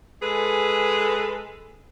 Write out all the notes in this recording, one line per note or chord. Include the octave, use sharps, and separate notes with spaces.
G#3 G#4 A4 B4